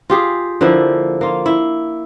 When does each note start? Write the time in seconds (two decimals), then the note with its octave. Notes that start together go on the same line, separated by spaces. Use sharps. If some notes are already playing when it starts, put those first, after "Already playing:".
0.10 F4 G4 G#4
0.61 D3 F3 A#3 E4
1.21 A#3 F4
1.46 E4